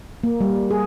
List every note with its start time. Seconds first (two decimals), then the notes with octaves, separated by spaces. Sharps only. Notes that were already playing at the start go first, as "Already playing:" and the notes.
0.24 A#3
0.41 G3
0.71 G#4